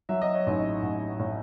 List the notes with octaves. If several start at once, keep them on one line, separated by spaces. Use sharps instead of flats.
F#3 E5
D#5
C#5
A1 D#4 D#5
A1
A2